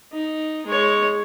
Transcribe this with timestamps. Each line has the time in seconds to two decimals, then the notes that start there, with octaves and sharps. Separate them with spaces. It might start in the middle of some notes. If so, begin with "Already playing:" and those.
0.12 D#4
0.66 G#3 C#5